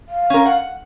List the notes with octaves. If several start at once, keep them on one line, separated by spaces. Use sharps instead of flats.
F5
C#4 A#4
F#5